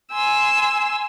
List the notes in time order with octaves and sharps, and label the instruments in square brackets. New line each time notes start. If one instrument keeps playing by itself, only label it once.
[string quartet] G#5 C6 E6